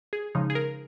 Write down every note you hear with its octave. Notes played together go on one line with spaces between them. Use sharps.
G#4
C#3 F3 G#3 D#4
G#4
A#4